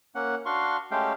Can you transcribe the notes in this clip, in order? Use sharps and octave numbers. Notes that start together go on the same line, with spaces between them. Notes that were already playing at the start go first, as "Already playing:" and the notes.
A#3 C#4 F#5
D4 F#4 F5 C6 C#6
G#3 A3 C#4 G4 F5 G5